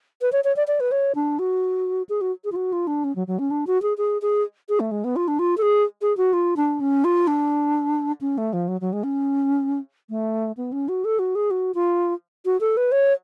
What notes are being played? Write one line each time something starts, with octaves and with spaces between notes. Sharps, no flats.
B4
C#5
C#5
D5
D5
B4
C#5
D4
F#4
G#4
F#4
G#4
F4
F#4
F4
D4
C#4
F#3
F#3
C#4
D4
F#4
G#4
G#4
G#4
G#4
A3
G#3
B3
F4
D4
F4
A4
G#4
G#4
F#4
F4
D4
C#4
F4
D4
C#4
A3
F3
F#3
F#3
G#3
C#4
A3
B3
C#4
F#4
A4
F#4
G#4
F#4
F4
F#4
A4
B4
C#5